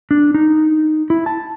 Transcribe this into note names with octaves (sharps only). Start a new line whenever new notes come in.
D4
D#4
E4
A5